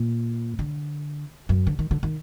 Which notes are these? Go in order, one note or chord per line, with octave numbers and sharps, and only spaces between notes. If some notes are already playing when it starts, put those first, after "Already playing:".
Already playing: A#2
D3
F#2
D3
D#3
D3
D#3